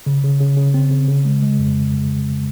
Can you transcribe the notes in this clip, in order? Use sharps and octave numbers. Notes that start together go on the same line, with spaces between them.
C#3
C#3
C#3
C#3
C4
C#3
C#3
G#3
G#3
F2